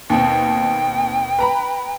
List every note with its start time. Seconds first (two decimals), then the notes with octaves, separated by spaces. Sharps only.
0.10 D#2 B2 C4 G5
1.39 B4 A#5 B5